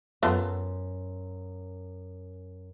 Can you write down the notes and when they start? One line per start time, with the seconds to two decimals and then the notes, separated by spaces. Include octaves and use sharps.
0.23 F#2 B3 F4 A4 C5